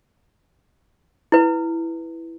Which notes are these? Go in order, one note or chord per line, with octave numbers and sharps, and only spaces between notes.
E4 B4